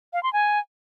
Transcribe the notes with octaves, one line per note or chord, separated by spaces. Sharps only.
F5
C6
G#5